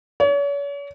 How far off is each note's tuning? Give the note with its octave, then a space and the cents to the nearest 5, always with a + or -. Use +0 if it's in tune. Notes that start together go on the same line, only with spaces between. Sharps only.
C#5 +40